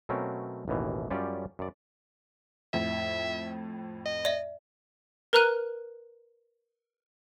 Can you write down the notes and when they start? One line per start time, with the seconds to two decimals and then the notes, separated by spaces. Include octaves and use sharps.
0.09 B2 F#3 A3 C4 C#4 A#4
0.68 A1 D#2 B2 E3
1.10 F#2 G3 C#4 F4 G4 D5
1.59 F#2 D5
2.74 F2 A2 E5
4.05 D#5
4.25 D5 E5
5.33 A#4 B4 A#5 F6 F#6 D#7